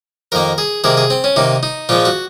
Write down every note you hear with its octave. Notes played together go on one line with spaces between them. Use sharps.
F2 D#3 A#3 A#4
G#4
C3 D#3 A#3 G#4
G#4
C4
C#4
C3 D#3 A#3 D#4
D#4
A#2 F3 G#3 F4
F#4